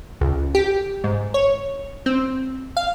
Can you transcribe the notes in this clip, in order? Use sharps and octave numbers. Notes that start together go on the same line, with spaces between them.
C#2
G4
G#2
C#5
C4
F5